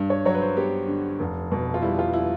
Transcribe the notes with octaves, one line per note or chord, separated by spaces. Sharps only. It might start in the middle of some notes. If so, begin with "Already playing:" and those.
Already playing: G2
C#5
F#3 C#5
B4
C5
B3 G4
D3
F1
B2
F4
G3 E4
F4
E4